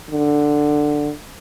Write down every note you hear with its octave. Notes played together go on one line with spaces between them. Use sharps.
D3